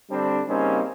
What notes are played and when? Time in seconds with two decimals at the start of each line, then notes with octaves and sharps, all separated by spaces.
0.10 D3 G3 C4 D4
0.48 C#3 G3 A#3 C4 C#4 D#4